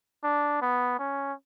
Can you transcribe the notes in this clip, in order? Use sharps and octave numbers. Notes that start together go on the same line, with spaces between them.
D4
B3
C#4